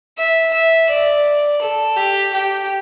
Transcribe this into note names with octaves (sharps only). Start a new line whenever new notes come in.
E5
E5
D5
A4
G4
G4